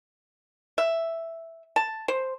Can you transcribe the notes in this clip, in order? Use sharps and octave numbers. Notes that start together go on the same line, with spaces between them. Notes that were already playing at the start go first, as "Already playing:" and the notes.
E5
A5
C5